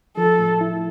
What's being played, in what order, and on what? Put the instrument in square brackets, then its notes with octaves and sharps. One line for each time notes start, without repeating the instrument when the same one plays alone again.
[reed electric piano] F3 [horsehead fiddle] A4
[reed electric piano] A2
E4